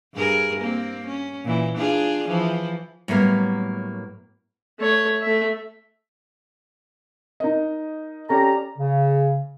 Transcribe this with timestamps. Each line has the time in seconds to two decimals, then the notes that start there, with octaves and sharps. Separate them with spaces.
0.14 G2 G#4 A#4
0.60 A#3 C4
1.07 C#4
1.44 A#2 E3
1.77 D4 F4 G#4
2.28 E3 F3
3.08 A2 F#3 G3 A#3 B3
4.80 A3 C#5
5.22 A3 E5
7.40 D#4 A#4 D#5
8.29 C#4 G4 A4 D5 A#5
8.78 C#3